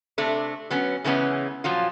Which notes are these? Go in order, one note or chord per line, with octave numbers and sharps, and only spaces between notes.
C3 A3 D4
F#3 B3 C#4
C#3 E3 G#3 B3 C#4
A#2 F3 F#3 F4